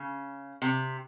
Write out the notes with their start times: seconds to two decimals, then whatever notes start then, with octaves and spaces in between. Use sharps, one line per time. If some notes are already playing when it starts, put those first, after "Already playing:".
Already playing: C#3
0.62 C3